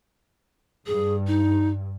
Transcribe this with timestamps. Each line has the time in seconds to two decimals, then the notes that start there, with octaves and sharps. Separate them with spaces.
0.87 G2 G#4
1.27 D#4